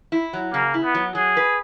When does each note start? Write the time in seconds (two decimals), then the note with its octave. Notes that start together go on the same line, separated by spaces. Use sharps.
0.12 E4
0.33 F#3
0.53 C#3 A#3
0.74 E4
0.84 B3
0.94 F#3
1.15 F#3 G#4
1.37 B4